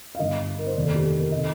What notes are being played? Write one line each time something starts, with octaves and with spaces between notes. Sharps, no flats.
F5
G1 G2 D3 D#5
A#4
C5
F1 D#2 D#3 D5
A4
G4
A4
A#4
C3 D#3 D#5